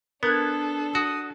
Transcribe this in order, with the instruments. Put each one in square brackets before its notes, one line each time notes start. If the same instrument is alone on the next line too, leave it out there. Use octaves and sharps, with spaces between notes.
[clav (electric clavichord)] B3 [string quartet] D4 A4 [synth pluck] A#4 F#6 G#6
[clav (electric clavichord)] F#4 [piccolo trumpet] D#6